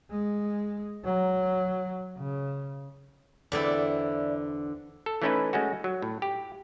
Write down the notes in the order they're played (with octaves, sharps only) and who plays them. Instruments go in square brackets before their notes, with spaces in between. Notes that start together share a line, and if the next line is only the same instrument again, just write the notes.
[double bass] G#3
F#3
C#3
[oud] E2 D3 C4 [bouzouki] E4 D5
[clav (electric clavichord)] A4
E3 A3 C#4 D#4 E4 B4
G#3 A3 C#4 F#4
F#3
A2
G4